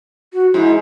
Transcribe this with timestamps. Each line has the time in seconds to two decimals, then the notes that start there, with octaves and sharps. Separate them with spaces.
0.33 F#4
0.54 G#2 E4